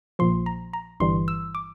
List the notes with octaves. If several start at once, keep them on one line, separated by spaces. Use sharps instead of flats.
A#1 A#2 F3 C6
A#5
A#5
G1 G2 E3 G3 C6
E6
D6